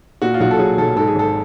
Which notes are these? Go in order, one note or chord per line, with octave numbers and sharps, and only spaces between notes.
A#2 F#4
F4
B1 F#4
A4
F#3 G#4
B1 A4
G#2 A4
G#4
G#1 A4